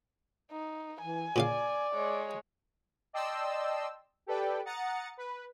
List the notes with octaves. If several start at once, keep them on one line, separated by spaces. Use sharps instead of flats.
D#4
E3 G#5
A#2 C#3 D5 F5
G#3 C#5
D5 D#5 G5 A5 C6 E6
G4 A4 B4 D5 G5
F#5 A#5 D#6 A6 C#7
B4